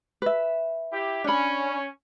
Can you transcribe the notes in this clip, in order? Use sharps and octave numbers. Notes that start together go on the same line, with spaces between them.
B4 E5
E4 G4
C#4 D4 B5